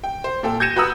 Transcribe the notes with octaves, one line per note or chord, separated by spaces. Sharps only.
G5
C5
A#2 A4 G5
G6 G#6 A#6 C#7 D#7 E7
F#4 B4 F#5 A#5 D#6 E6